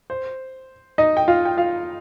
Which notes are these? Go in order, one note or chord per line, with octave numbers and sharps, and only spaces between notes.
C5
D#4 D#5
G5
F4 F5
G5
F4 F5